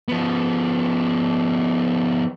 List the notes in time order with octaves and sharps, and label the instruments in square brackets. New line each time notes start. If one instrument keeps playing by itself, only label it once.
[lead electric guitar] F3 B3